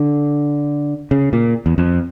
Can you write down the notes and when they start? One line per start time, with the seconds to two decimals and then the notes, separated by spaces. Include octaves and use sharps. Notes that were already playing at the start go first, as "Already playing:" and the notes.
Already playing: D3
1.11 C#3
1.33 A#2
1.66 E2
1.78 F2